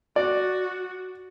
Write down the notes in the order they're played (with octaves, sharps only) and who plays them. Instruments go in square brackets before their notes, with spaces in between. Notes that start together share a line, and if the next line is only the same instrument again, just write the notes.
[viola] F#4 [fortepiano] D5